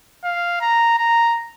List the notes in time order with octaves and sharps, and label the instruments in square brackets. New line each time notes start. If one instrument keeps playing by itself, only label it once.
[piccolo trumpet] F5
A#5
A#5